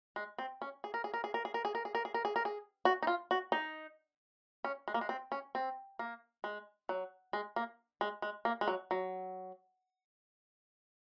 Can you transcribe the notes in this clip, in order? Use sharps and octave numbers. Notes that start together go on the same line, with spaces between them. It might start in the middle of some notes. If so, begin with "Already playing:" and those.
G#3
C4
C#4
G#4
A#4
G#4
A#4
G#4
A#4
G#4
A#4
G#4
A#4
G#4
A#4
G#4
A#4
G#4
A#4
G#4
F#4
D#4
F4
F#4
D#4
C#4
G#3
A#3
G#3
C4
C#4
C4
A#3
G#3
F#3
G#3
A#3
G#3
G#3
A#3
G#3
F#3
F#3